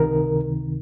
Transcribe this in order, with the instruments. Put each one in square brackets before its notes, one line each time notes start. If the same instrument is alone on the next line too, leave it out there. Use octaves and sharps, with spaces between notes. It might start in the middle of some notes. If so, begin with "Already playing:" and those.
Already playing: [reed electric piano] C#2 C3 D#3 A#4